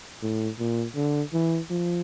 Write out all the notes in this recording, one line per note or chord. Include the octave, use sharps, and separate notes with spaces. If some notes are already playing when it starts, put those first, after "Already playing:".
A2
A#2
D3
E3
F3